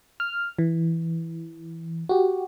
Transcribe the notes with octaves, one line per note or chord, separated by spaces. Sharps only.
F6
E3
F#4 G4